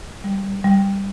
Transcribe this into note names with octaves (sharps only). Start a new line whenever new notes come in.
G3
G3
G3